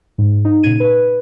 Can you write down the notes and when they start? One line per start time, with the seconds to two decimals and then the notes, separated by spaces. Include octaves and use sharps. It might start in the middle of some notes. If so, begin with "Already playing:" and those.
0.18 G#2
0.45 D#4
0.63 A#2 C#3 G#6 D#7
0.80 B4